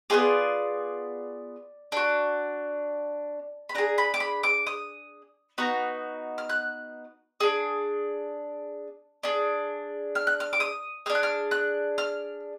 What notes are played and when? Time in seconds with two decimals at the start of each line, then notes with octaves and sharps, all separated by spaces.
0.10 B3 D4 F4 G#4 D5
1.92 D4 F#4
3.69 B5
3.75 D4 G#4 A#5
3.98 B5
4.14 D6
4.20 B5
4.43 D6
4.67 D#6
5.58 B3 D#4 F#4
6.38 F6
6.49 F#6
7.40 D4 G#4
9.23 D4 G#4
10.15 F6
10.27 F#6
10.40 F6
10.53 D6
10.60 D#6
11.06 G#4 F6
11.10 D4
11.15 F#6
11.23 F6
11.51 F#6
11.98 F6